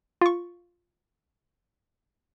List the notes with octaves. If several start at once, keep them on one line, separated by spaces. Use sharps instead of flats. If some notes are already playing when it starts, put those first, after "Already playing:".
F4 C#6